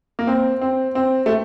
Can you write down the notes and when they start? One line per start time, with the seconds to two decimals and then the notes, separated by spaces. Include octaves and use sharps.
0.19 A#3
0.27 C4
0.61 C4
0.95 C4
1.26 A3